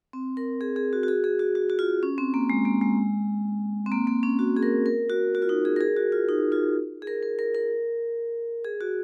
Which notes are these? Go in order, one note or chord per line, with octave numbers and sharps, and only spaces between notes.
C4
A#4
G#4
G#4
F#4
F#4
G#4
G#4
F#4
F#4
F#4
F4
C#4
C4
A#3
G#3
A#3
G#3
C4
A#3
A#3
C#4
F#4
G#4
A#4
A#4
F#4
F#4
F4
D#4
G#4
A#4
G#4
F#4
F4
D#4
F4
G#4
A#4
A#4
A#4
A#4
G#4
F#4